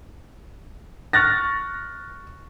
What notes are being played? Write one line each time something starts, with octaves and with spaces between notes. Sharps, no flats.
C#6 F6 F#6 A6 A#6